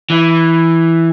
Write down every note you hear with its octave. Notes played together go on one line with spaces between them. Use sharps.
E3